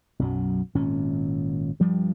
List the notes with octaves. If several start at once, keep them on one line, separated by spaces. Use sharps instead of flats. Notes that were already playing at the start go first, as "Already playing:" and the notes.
B1 F#2 F#3
G#1 A#2 C#4
G2 F3 G3